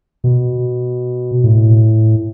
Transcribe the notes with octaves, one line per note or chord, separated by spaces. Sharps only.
B2
A2